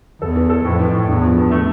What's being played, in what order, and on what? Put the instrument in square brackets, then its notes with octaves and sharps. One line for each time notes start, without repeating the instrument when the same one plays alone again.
[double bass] E2 [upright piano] A4
[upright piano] E3
A4
[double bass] F2 [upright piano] A2
[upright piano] E3
A2
[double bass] E2 [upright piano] G2
[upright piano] F3
G2
A3